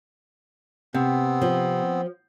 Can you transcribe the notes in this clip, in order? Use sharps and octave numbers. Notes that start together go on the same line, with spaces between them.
C3 B3 C4
F3